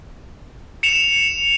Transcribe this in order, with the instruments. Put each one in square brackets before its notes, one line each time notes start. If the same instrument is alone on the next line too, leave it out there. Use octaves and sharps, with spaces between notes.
[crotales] C#7 E7 F7